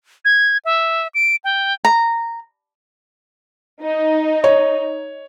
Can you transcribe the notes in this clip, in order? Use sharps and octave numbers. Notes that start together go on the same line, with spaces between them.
G#6
E5
D7
G5
A#5
D#4
C#5